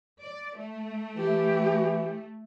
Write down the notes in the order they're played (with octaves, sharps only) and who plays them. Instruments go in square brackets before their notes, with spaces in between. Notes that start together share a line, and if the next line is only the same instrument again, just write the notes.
[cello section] D5
A3
[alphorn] E3 [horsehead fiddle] G4